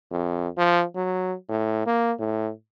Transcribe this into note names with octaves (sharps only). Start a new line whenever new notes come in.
F2
F3
F#3
A2
A#3
A2